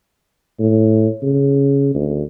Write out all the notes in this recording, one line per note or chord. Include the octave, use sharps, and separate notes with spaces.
A2
C#3
D2